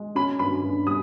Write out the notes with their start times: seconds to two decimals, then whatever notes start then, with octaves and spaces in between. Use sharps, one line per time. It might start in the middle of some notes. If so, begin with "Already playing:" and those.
Already playing: G#3
0.15 C#4 B5
0.39 G2 B5
0.64 G2
0.87 G3 D#6